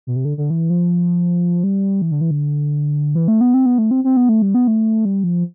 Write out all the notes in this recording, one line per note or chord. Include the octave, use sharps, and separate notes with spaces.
B2
C3
D3
D3
E3
F3
G3
E3
D3
E3
D3
E3
A3
B3
C4
B3
A3
C4
C4
B3
A3
G3
B3
A3
G3
F3